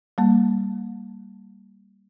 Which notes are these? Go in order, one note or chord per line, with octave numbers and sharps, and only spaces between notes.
G3 A#3